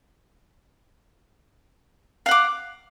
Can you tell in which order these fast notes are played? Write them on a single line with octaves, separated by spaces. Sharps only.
F5 F#5 D6